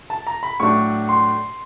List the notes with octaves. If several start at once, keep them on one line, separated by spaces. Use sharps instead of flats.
A5
A#5
B5
A2 F#3 A3 D4 C#6
C6